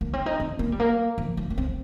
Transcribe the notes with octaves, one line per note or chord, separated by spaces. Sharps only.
A#3
C4
D#4
C4
A#3
G3
A#3
F3
A#3
A#3
C4